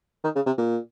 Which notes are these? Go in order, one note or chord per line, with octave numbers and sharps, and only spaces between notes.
D#3
C#3
C3
A#2